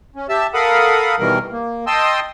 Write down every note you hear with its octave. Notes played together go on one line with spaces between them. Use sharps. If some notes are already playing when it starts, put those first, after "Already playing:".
C#4
G4 E5 A5 E6
A4 A#4 F5 F#5 B5 D#6
B2 D#3 E3 G3 A#4
A#3
D#5 G5 A5 C6 D#6 E6